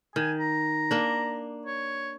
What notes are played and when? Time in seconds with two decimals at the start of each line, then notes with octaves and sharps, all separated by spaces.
0.16 D#3 G#5
0.39 A#5
0.91 A#3 D4
1.66 C#5